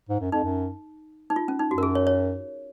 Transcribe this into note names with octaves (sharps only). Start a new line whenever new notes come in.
G#2
F#2
F2 D#4
F#2
D#4
F4
C#4
D#4
F#2 F#4
A#4
G#4
C#5
C#5